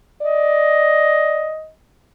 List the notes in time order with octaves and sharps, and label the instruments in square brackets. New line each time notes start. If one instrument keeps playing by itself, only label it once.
[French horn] D5 [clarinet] D#5